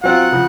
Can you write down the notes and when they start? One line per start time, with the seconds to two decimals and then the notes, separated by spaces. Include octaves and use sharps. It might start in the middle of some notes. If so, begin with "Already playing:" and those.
0.04 F#3 C4 F4 F#5
0.32 C#3 F3